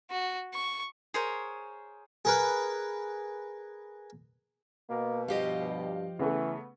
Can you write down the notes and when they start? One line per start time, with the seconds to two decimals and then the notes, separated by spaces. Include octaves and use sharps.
0.11 F#4
0.54 C#6
1.14 G#4 A#4 C5 C#5
2.25 G#4 A#4 B4
4.90 B2 A#3
5.28 G2 F3 G4 D#5 F5
6.19 C#3 E3 A3 B3